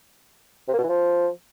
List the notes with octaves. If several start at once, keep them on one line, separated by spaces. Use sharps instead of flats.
C3
A#3
B2
E3
F3